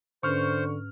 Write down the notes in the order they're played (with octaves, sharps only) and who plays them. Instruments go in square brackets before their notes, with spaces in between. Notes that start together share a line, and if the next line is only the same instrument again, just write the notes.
[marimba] G#2 C#4 B4 [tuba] D3 [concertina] C5 [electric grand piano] C#6 F6